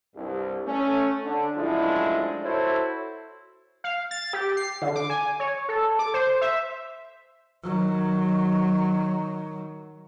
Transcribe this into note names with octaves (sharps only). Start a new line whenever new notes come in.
C2 G2
A3 C#4
D3 D4
F#2 A2 F3 G#3 D4 E4
E4 F#4 A4 C5 C#5
F5
A6
G4
C7
D3
D6
G#5
C#5
A4
D6
C5
E5
D#3 F#3